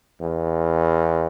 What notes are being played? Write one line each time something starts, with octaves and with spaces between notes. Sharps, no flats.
E2